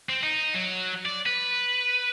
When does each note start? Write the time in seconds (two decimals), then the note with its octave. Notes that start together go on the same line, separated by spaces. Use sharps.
0.09 C4
0.23 D#4
0.54 F#3
1.06 D5
1.26 B4